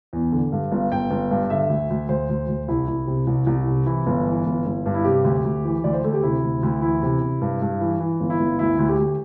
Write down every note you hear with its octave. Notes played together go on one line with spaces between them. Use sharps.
E2
D3
G2
G1
G1 G5
G1
G2
D3 E5
D2
D2
D2 C5
D2
D2
C2 E4
C2
C3
C2
C2
C3
E3 E4
G1
E3
G1
G1
G2
E4
C3 G4
D2
D2
E3
D2 D5
C5
D2 A4
G4
C3 E4
D2
D2
E3 E4
C3
C3
G2
G2
E3
E3
G1
E4
G1
D2 E4
D2
G4
D2